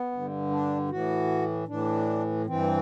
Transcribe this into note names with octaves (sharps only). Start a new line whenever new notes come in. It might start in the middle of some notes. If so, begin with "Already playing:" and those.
Already playing: B3
G2 D3
D4
A2 E3 F#4
A2 E3 D4
G2 E3 C4